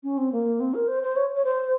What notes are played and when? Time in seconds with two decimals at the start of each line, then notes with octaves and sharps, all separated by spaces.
0.03 C#4
0.17 C4
0.32 A#3
0.60 C4
0.74 A#4
0.88 C5
1.03 C5
1.16 C#5
1.35 C#5
1.44 C5